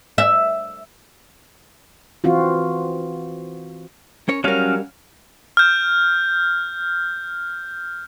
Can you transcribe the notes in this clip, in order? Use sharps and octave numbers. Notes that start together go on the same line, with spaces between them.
E5
E3 C4 F4 F#4
C#4 A#4 C#5
F#3 G3 C#4 A#4 F5
F6 G6